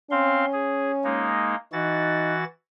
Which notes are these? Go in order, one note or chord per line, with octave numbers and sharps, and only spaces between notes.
C4 C#4 F5 C6
G#4
G#3 A#3 D#4
E3 D#4 F#4 A6